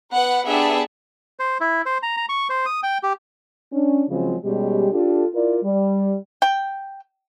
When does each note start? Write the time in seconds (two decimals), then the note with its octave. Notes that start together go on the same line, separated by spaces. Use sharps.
0.12 B3 B4 F#5
0.46 B3 D4 G4 G#4 E5 A5
1.39 C5
1.61 E4
1.86 C5
2.03 A#5
2.17 A#5
2.29 C#6
2.50 C5
2.66 D#6
2.83 G5
3.03 G4
3.73 C#4 D4
4.09 C#3 F3 F#3 G#3 C4
4.44 B2 G3 G#3 C#4 G4
4.92 D4 F4 G4 A4
5.34 E4 F4 A#4 D5
5.63 G3
6.42 G5